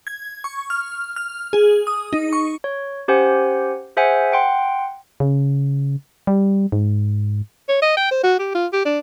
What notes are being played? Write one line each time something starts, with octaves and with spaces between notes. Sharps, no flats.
G#6
C#6
F6
F6
G#4
D#6
D#4
C#6
C#5
C#4 G4 C5 F#5 G#5
G#4 C5 E5 F#5 G#5
F#5 G5 C6
C#3
G3
G#2
C#5
D#5
G5
C5
F#4
G4
F4
G4
D4